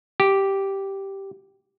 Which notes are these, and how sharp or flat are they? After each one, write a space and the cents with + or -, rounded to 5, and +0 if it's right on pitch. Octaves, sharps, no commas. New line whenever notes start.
G4 -5